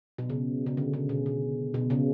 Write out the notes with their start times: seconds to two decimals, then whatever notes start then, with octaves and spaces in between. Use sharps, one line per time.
0.18 B2
0.30 C#3
0.66 C#3
0.77 D3
0.93 C#3
1.09 B2
1.26 B2
1.74 B2
1.90 C#3